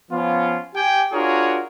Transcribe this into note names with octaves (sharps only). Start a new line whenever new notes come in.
F3 B3 C#4 F4
G4 G5 G#5
D4 F4 F#4 G#4 A#4 C#5